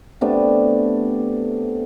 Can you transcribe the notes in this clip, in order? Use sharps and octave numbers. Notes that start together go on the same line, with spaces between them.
C3 A3 B3 D4